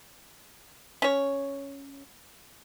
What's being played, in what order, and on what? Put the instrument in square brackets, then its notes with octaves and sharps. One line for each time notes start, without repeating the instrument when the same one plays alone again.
[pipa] C#4 C#5